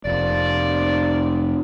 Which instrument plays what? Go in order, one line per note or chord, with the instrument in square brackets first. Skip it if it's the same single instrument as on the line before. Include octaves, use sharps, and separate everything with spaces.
[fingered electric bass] F1 [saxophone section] F3 A#3 D5